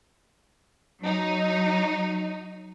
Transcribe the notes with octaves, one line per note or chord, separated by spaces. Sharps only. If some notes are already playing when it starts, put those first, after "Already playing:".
F#3 D#4